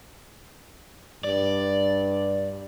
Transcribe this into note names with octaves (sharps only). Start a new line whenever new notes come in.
G2 D5